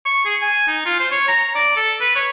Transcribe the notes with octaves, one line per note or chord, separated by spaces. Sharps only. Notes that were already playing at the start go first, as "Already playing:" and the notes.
C#6
G#4
G#5
D#4
F4
C5
C#5
A#5
D5
A4
B4
C#5